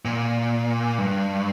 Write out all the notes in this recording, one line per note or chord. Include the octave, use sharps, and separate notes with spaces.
A#2
G2